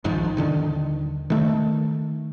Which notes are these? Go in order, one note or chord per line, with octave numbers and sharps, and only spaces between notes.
A#1 G#2 D#3 F3
D#1 D3 D#3 D4
D#3 A3